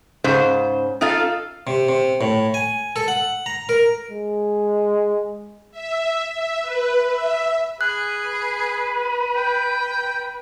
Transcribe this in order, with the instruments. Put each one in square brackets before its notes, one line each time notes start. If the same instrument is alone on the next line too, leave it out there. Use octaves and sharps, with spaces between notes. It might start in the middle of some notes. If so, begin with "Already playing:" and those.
[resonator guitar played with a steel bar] G#2 C#3 C5
D#4 F4 A4 F5
[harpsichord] C3
C3
A2
G#5
A4
F#5
A#5
A#4
[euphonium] G#3
[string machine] E5
E5
B4
E5
[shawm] G#4 [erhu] B4 [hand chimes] F#6
[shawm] G5